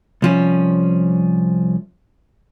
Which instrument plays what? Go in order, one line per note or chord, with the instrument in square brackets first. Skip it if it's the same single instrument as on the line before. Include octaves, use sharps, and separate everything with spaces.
[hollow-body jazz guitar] C2 F3 C#4